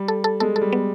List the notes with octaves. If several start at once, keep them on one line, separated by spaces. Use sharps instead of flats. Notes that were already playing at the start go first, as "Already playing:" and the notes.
Already playing: G3
A4
A4
G#3 A4
A4
G3
B3